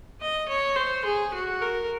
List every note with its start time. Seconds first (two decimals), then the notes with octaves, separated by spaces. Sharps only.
0.21 D#5
0.48 C#5
0.76 C5
1.05 G#4
1.34 F#4
1.62 A#4